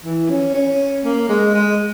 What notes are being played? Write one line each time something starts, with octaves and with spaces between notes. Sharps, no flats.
E3
C#4
C#4
A#3
G#3
G#3